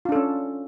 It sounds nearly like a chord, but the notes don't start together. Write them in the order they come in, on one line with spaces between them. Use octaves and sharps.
F4 D4 A4 C#4